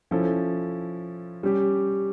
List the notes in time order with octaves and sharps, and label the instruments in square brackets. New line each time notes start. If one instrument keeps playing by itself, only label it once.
[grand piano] F3 C#4 E4 A4
G3 C#4 G4